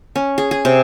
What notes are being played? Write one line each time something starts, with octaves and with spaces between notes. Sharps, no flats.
C#4
G#4
G#4
C3